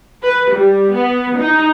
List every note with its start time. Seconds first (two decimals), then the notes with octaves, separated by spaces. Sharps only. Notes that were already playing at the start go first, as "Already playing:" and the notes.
0.22 B4
0.53 G3
0.94 B3
1.38 D#4